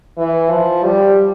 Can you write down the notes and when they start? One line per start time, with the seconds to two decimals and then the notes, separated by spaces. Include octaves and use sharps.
0.18 E3
0.51 F3
0.84 G3